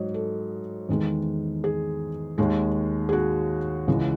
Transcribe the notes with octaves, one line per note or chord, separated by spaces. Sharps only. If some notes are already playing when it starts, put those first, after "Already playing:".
Already playing: G#2 F#3 C#5 D#5
A4
E2 D#3 G#3
G#4
D#2 D#3 G#3
G#4
F#4
C#2 C#3 E3 G#3